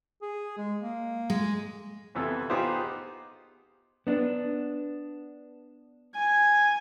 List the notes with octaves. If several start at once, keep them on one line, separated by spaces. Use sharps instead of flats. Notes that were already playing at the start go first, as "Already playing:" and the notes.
G#4
G#3
A#3
G#3
F2 C3 E3 B3 A4
B3 D#4 F4 G4 G#4 C5
B3 D4
G#5